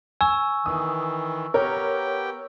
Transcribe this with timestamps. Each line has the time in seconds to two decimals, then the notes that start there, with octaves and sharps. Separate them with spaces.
0.21 G#5 C#6 E6 E7
0.66 D#3 E3 D#6
1.54 B3 G4 A#4 C#5 G5